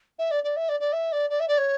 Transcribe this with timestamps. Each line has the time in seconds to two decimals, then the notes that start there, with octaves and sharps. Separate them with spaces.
0.18 E5
0.31 D5
0.43 D5
0.56 E5
0.68 D5
0.80 D5
0.92 E5
1.12 D5
1.30 D5
1.40 E5
1.48 D5
1.57 C#5